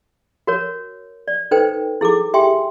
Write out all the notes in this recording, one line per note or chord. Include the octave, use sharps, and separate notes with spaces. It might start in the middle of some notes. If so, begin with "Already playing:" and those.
F#4 A#4 C#5
D5
D#4 A4 B4 C5 G5
E4 G#4 A4 D6
G4 E5 G5 G#5 C6